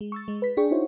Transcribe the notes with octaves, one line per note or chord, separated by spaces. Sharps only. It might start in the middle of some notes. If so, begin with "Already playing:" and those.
G#3
C#6 E6 A6
G#3
B4 B6
D4 G#4 G5 C#6
D#4 E4 F#4 C5 C#5